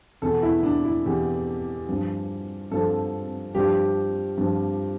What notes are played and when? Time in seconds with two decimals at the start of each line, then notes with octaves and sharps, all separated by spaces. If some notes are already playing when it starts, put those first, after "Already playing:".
0.22 E2 B2 A4
0.43 E4
0.63 D4
0.85 E4
1.05 E2 B2 G4
1.89 G2 F3
2.71 G2 F3 A4
3.55 G2 F3 G4
4.38 G2 F3